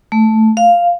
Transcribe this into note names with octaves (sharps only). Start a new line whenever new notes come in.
A3
F5